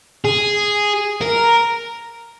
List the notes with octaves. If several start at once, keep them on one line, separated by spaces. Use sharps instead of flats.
G#4
A#4